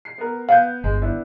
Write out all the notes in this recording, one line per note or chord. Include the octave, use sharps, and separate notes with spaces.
C7
B3 A#4
B3 F5 G6
G1 G#3
B3 D4 E4